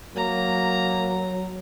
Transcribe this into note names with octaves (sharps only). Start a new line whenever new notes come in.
F#3 A#3 A#5